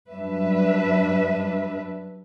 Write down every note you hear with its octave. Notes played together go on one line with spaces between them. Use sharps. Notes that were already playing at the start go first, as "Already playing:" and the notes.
F#2 F#3 G3 D4 B4 E5